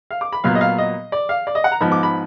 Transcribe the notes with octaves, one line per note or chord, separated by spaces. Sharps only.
F5
D6
B5
A#2 F#3 B3 F5
D#5
F5
D#5
D5
F5
D5
D#5
F#5
A#5
G#2 F3 B3 B5
D6
B5